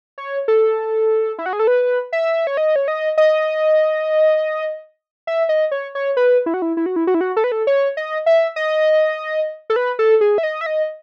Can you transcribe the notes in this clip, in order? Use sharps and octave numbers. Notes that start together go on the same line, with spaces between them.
C#5
A4
E4
F#4
G#4
A4
B4
E5
C#5
D#5
C#5
D#5
D#5
E5
D#5
C#5
C#5
B4
E4
F#4
E4
E4
F#4
E4
F#4
E4
F#4
A4
B4
A4
C#5
D#5
E5
D#5
A4
B4
A4
G#4
E5
D#5
E5
D#5